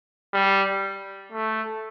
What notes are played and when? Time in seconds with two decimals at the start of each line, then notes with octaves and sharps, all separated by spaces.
0.34 G3
1.32 A3